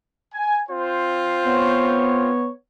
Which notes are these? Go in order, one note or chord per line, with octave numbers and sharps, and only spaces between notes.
G#5
C4 F4 C5
B3 C#5